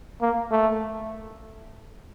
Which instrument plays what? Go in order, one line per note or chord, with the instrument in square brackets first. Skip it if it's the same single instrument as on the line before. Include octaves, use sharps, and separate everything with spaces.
[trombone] A#3
A3